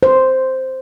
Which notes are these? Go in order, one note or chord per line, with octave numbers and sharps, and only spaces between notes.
C5